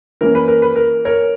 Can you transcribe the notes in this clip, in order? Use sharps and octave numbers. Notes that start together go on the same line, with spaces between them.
E3 A#3 C#4 A#4
B4
A#4
B4
A#4
A#4 C#5